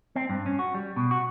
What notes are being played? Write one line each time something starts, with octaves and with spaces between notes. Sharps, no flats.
C4
G2
C#4
F#4
G3
B2
F#4